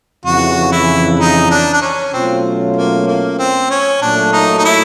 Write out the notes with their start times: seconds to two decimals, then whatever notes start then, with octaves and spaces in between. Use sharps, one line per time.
0.24 F2 C#3 E3 F#4
0.72 E4
1.20 D#4
1.51 D4
1.73 D4
1.82 C#4
2.13 B2 F#3 A3 C4 C#4 F4
2.76 A#3
3.07 A#3
3.39 C4
3.70 C#4
4.01 A#2 F#3 A3 D4
4.33 D#4
4.58 D#4
4.65 E4